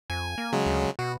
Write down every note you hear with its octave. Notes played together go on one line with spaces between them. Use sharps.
F2 G#5
A#3
C#3 F#3 G#3
D2
B2 F#4